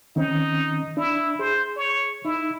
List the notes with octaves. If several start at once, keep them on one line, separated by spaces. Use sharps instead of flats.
D#3 C4 C#4 D#4
D4 E4
G#4 C5
C#5
D#4 E4